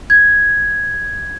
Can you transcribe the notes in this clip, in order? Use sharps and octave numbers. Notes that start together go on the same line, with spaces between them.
G#6